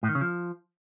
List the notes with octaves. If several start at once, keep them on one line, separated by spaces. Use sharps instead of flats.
A2
D#3
C#3
F3